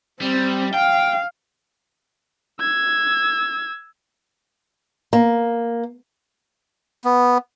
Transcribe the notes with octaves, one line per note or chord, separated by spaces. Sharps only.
G3 C4
F5 G5
E6 G#6
A#3
B3